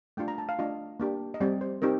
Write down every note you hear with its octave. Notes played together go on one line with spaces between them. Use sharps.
A3 D4 F4 G5
A#5
A5
F5
A3 D4 F4 D#5
A#3 D4 G4
D#5
G3 C4 G4 D5
C5
C4 D#4 G4 A#4